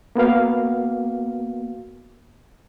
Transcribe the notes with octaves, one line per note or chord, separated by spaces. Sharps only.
A#3 B3 F#4 F5